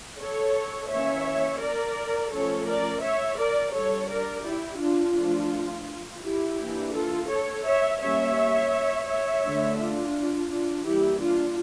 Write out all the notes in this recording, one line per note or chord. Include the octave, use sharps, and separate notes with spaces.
A4 C#5
E3 A#3 C#4 C#5 E5
A#4 D5
F3 A3 C#4 A4 C#5
A#4 D5
C#5 E5
A#4 D5
G3 D4 A4 C#5
A#4 D5
E4 G4
D4 F4
F3 A3 D4
E4 G4
E3 A#3 D4
F4 A4
A4 C#5
C#5 E5
G3 A#3 C#4 C#5 E5
C#5 E5
D3 A3 D4
D4 F4
D4 F4
E3 G3 A#3 E4 G4
D4 F4